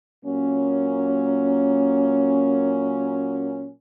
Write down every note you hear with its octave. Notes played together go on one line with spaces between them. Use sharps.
A#2 F#3 A#3 C#4